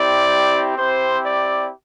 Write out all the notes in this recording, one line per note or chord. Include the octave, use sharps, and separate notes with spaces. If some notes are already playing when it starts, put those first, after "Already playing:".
Already playing: C4 E4 G4 D5
C4 E4 G4 C5
D5